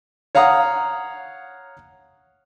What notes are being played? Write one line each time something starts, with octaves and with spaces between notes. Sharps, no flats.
C#5 F5 F#5 A#5 D#6